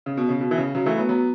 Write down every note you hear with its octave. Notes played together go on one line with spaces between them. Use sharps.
C#3
B2
C#3
B2
E3
C#3
C#3 F#3
E3 A3
F#3 B3
F#3 B3